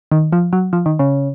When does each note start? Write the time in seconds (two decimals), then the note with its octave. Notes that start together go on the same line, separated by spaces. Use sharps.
0.11 D#3
0.32 F3
0.53 F#3
0.73 F3
0.86 D#3
0.99 C#3